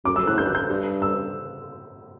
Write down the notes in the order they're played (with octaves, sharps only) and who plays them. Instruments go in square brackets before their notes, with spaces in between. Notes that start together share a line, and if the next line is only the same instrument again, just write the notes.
[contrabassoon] F#2 [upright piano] D6
[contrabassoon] F#2 [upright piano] E6
[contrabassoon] A2 [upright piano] F#6
[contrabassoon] G2 [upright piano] G6
[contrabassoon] F#2 [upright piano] F#6
[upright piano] G6
[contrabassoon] G2
[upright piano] E6